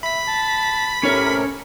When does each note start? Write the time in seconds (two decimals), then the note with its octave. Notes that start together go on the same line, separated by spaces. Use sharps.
0.03 E5 B5 B6
0.28 A5
1.03 A2 C3 C#4 A4 A#4 C#5